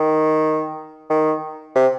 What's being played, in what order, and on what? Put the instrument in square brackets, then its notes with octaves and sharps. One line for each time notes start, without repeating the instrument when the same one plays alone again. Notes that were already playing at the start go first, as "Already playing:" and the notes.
Already playing: [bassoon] D#3
D#3
C3